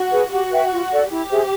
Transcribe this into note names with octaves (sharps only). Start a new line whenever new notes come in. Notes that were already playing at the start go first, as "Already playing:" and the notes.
Already playing: F#4
G#4 B4
F#4 G4
B4 E5 G5
F4
A4 D5
E4 G4
G#4 C5 E5